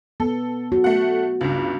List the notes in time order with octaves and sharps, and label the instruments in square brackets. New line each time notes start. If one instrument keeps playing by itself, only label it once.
[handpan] B3 [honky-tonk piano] A4
[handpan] F#4
[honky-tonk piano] A3 F#5
C#2 G2